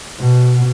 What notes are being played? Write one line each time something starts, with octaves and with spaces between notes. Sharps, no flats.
B2